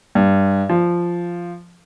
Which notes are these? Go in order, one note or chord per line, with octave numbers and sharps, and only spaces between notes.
G2
F3